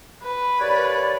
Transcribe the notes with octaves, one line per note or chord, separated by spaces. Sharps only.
B4
D#2 C#5 D5